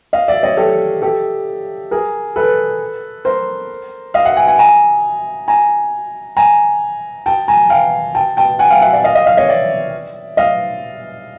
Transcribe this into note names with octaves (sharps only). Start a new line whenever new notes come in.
D#5 F5
D5 E5
C#5 D#5
G4 A4
G4 A4
G#4 A#4
A4 B4
A#4 C5
D#5 F5
E5 F#5
F#5 G#5
F#5 G#5
G#5 A#5
G#5 A#5
G#5 A#5
G5 A5
G#5 A#5
F5 G5
G5 A5
G5 A5
F#5 G#5
F5 G5
E5 F#5
D5 E5
D#5 F5
D#5 F5
D#5 F5
C#5 D#5
D5 E5
D#5 F5